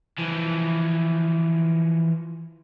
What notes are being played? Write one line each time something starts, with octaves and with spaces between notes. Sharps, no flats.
E3 F3